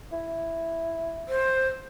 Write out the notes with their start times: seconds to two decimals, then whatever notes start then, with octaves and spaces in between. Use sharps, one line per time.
0.12 E4
1.28 C5